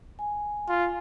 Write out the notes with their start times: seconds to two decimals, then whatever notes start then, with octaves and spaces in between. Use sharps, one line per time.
0.19 G#5
0.69 F4